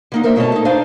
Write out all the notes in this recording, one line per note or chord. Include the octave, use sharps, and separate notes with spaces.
D3 A#3 D#4
D#4 A#4 C5 E5
G2 B2 A3 C#5 D#5 A5
D#4 A4
D4 D#4 C5 D5 F5